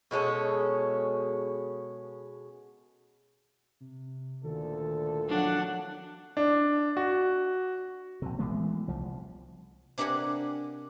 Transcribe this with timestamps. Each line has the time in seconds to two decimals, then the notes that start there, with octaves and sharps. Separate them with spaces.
0.11 B2 G#3 C#4 A4
3.80 C3
4.44 D2 A#2 D#3 A4
5.29 F3 F#3 D4 F#5
6.37 D4
6.97 F#4
8.22 A#1 C3
8.39 E3 G#3 A3 B3
8.88 C2 F3
9.98 C3 D4 G4 A#4 F#5 G#5